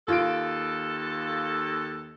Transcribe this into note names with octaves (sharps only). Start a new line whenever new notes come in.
D#2 F4 A4 D7